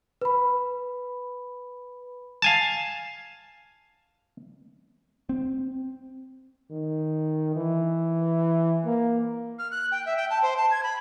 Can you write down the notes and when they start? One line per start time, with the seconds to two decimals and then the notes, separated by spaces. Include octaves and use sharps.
0.21 B4 B5
2.42 F5 G#5 A5
5.29 C4
6.71 D#3
7.56 E3
8.86 A#3
9.58 F6
9.71 F#6
9.91 G5
10.05 E5
10.17 G5
10.30 A5
10.42 C5
10.56 A5
10.71 G#6
10.83 B5